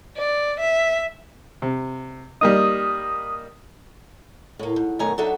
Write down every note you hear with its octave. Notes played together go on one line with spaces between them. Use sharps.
D5
E5
C3
G3 A#3 D#4 D#6
A2 A#3
G#2
F#2 B2 D#3 A3 G#5 A#5
F#3 D4 D#4 F#4 A4 E5